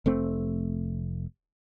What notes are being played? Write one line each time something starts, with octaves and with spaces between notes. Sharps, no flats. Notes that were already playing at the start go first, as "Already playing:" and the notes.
F1 A3 C4